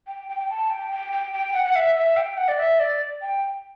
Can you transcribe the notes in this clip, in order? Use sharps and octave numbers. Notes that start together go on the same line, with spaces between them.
G5
G5
G5
A5
G5
G5
G5
G5
F#5
F#5
E5
E5
G5
F#5
D5
E5
D5
G5